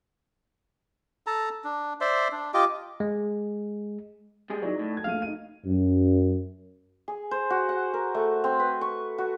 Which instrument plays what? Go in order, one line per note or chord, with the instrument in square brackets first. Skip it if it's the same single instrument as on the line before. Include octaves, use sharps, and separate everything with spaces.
[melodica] A4 A5 A#5
D4
C5 D5 E5 C6
D4
F4 G4 D#5 D6
[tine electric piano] G#3
[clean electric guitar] G3 G#3 G#4
[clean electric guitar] F#3 [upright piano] D#4 E4 D5
[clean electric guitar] A2
[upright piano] A5 G#6
[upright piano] A#1 A3 D#7 [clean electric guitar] F5
[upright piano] D#4 D#7
[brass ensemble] F#2
[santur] G#4
C5
F#4
F#5
A#4
A3
C4
B4
C#6
F#4